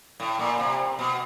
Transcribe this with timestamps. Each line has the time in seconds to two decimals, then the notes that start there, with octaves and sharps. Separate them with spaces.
0.20 A2
0.39 A#2
0.59 C3
0.99 B2